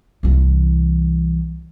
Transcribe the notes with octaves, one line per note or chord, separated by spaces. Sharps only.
C2 E3